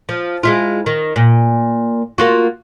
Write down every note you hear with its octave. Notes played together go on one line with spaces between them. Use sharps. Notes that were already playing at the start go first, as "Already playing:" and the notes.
F3
G#3 E4 F4
D#3
A#2
A#3 F4 F#4